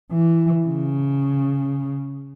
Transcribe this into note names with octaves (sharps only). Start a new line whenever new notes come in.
E3
C#3